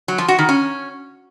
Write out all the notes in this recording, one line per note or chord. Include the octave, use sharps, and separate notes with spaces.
F#3
F3
F#4
D#3
C#4